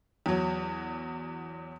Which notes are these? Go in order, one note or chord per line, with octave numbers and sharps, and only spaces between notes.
E2 F#3